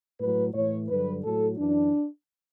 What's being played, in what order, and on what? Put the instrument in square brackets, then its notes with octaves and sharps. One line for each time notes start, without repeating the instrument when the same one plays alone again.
[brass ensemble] A2 F#3 B4
A2 E3 C#5
G2 D3 F#3 B4
A2 F#3 A4
F#2 E3 D4